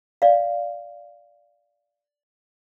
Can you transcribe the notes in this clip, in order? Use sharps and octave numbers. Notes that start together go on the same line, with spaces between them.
D5 F5